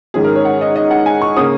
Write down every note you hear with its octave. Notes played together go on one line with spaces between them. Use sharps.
G#2 D#3 G#3 C#4 G#4
A#4
C#5
F#5
D#5
D#5
F#5
G#5
C#6
C#3 A#3 C#4 D#6